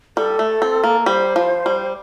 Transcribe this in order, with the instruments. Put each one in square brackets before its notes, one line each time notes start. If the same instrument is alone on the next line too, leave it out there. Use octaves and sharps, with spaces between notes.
[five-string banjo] G3 [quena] A4
[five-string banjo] A3
C4
A#3
[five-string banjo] G3 [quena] C5
[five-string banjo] F3
G3